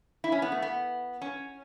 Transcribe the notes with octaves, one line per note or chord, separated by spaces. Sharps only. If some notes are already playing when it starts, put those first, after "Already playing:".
E4
C#4
B3
A3
B3
C#4